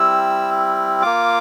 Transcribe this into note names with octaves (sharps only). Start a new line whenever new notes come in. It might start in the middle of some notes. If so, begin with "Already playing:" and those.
Already playing: G3 C4 E4 E6
A#3 F4 D6